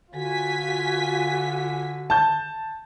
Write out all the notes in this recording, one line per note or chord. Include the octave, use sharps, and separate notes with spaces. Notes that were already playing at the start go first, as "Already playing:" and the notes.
D3 F4 F#4 G#5 B6
A5 G6